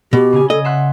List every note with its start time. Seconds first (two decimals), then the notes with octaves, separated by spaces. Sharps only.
0.13 B2 G4
0.33 C#3 C#4 G#5
0.50 A4 D#5
0.65 E5 F#5 C6 F#6